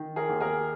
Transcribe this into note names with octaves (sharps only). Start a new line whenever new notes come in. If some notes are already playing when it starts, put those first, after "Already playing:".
Already playing: D#3
G#4 A#4
D#2
G#4 A#4